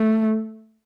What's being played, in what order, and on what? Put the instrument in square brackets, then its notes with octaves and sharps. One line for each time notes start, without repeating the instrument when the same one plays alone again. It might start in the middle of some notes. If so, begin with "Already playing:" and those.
Already playing: [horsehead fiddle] A3